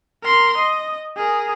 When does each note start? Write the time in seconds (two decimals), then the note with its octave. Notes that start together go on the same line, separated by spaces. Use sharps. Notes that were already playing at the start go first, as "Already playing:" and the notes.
0.23 A#4 C6
0.57 D#5
1.16 G#4 A#4